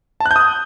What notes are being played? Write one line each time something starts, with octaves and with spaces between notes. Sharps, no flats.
A5
F#6
G6
D#6